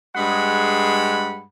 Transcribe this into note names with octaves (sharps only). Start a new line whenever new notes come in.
G2 G#3 G#4 F#5 B5